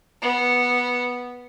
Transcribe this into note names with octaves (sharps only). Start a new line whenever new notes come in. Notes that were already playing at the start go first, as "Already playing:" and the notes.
B3